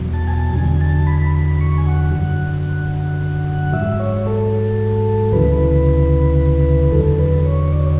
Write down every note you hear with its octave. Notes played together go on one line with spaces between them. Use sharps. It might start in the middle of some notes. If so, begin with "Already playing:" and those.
Already playing: E2 B2 F#3
A5
G#5
A5
E2 D3 F#3 G#5
A5
B5
B5
C#6
G#5
F#5
F#2 D3 F#3
G#2 F#3 E5
C#5
A4
D2 C#3 E3 B4
E2 D3 F#3 A4
B4
C#5
D5
C#5